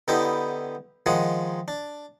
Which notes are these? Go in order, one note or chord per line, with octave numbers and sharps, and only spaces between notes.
D3 B3 D#4 E4 G4
D#3 F3 G#3 G#4 F#5
D4